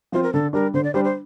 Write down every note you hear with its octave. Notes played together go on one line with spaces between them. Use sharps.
F3 C4 F4 C5
A#4
D3 A4
G3 D4 A#4
D3 C5
D5
G3 D4 C5
C5